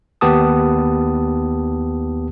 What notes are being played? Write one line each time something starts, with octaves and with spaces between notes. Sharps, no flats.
D#2 B3 G4 A5 D#6